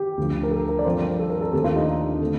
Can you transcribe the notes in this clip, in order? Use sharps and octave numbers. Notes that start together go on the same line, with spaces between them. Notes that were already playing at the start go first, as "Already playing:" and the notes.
Already playing: G4
D2 D3 F3
A#4
A4
A#4
D5
G2 F3 C4 C5
A4
A#4
A4
D#2 D3 A3 C4 G4
F4
D#4
D4
D3 A3 C4